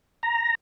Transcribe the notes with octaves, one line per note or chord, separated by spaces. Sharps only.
A#5